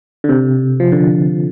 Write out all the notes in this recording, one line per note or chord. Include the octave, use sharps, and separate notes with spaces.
D3
C3
F3
D3